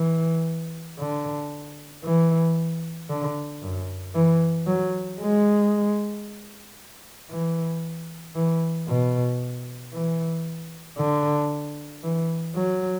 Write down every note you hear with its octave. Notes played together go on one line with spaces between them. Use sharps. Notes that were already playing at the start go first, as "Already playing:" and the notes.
Already playing: E3
D3
E3
D3
F#2
E3
F#3
G#3
E3
E3
B2
E3
D3
E3
F#3